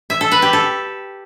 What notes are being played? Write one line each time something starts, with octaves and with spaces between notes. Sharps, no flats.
E5
A4
B4
G4
A4